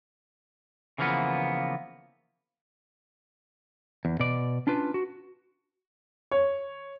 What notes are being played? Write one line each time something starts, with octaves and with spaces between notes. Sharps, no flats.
C#3 E3 F3 A#3 B3
E2
B2 D5
C#4 D4 F4 B4
F#4
C#5